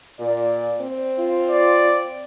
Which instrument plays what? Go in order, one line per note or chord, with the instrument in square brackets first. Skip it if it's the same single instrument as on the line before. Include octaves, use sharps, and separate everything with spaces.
[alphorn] A#2 [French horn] D5
[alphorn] C4
[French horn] F4
[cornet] D5